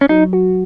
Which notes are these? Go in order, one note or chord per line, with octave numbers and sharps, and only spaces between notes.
C#4
F#3 D#4
F#4